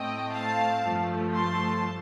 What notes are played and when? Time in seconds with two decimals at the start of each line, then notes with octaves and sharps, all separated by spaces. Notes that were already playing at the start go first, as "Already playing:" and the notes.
Already playing: A2 A3 C4 D#5 G5
0.32 F5 A5
0.84 G2 F3 A3
1.34 A5 C6